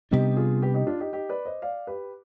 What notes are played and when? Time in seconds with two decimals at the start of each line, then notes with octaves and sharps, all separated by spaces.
0.11 C3 G3 B3 D4 D#4 G4
0.36 F4 G#4
0.62 G4 B4
0.74 D#4 G4
0.87 D4 F4
1.00 D#4 G4
1.12 D#4 G4
1.29 B4 D5
1.45 C5 D#5
1.62 D5 F5
1.87 G4 B4